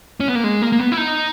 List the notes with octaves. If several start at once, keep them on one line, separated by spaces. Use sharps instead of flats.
C#4
B3
A#3
G#3
A#3
A#3
B3
E4
D#4